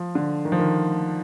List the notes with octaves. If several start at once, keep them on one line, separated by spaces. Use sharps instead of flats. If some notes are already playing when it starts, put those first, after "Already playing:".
Already playing: F3
D3
D#3
F3
D#3